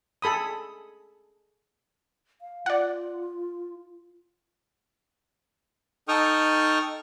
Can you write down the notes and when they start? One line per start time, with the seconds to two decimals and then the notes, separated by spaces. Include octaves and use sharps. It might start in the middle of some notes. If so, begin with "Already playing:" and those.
0.22 G#4 A4 B5 D#6
2.42 F5
2.66 F4 D5 F#5
6.08 D#4 A4 G5 C#6 D#6 F6